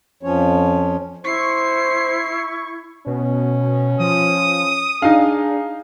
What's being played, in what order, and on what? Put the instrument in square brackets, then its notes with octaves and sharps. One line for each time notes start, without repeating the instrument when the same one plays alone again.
[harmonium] F2 F3 C#4 C#5
[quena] E4 [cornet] C5 [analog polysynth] C#6 [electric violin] C7
[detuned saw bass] B2 [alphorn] C#4
[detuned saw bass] F3 [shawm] D#6
[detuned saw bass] D4 [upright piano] D#4 F5 [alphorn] G#4